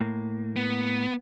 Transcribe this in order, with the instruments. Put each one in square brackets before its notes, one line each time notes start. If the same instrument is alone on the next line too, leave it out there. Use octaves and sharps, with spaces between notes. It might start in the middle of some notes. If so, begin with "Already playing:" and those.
[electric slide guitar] A2 A#3
[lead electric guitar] B3